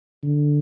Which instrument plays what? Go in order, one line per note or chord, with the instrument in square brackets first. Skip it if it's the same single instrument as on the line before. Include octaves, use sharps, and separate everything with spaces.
[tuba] D3